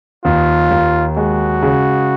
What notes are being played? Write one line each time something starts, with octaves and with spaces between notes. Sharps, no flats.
D#2 F4
D#2
G#3 F#4
C#3